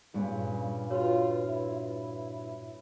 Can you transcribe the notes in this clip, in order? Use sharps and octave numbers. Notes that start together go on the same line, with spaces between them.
G2 A#2 C#3
F4 F#4 B4 C#5
E4